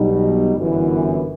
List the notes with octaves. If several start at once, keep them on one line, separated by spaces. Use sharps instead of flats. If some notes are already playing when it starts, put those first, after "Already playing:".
Already playing: B1 B2 G3 D#4
G1 F#2 E3